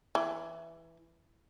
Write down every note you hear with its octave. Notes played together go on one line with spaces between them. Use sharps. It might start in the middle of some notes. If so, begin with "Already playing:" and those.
E3